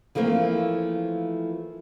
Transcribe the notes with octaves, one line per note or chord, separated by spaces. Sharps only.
E3 F3 A3 A#3 C4